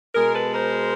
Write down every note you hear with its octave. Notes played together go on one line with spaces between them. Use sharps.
B2 G#3 G#4 A#4
A4 B4
A#4 C5